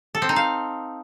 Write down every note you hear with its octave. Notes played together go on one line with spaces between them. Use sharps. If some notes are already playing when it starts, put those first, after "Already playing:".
A4
C4
D#4
F5